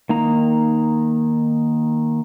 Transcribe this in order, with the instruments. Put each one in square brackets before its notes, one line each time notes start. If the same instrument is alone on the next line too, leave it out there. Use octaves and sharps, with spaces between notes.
[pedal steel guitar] D#3 A#3 D#4 A#5